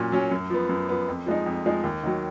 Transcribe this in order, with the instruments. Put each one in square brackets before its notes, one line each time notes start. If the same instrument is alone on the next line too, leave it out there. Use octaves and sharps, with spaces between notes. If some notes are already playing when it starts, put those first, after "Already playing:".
Already playing: [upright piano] A#2 F#3 C#4
F#3 C#4
F#2
F3 B3
F#2
F3 B3
F2
F3 G#3 D#4
F2
F3 G#3 D#4
D#2
D#3 F#3